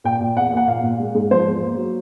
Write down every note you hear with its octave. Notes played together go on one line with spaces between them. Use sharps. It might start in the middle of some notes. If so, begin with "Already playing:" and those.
A#2 G5
A#2
E2 F#5
A#3 F#5
A#2 F5
A#2
G#3
G#2
F3 C5
E2
A#3
F#3